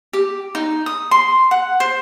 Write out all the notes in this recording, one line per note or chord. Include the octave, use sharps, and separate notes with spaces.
G4
D#4
D#6
C6
F#5
C5